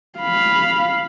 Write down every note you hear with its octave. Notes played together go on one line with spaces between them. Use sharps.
F5 B5